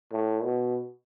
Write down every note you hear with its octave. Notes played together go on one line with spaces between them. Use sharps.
A2
B2